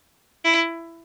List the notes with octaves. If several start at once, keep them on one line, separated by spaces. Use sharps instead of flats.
E4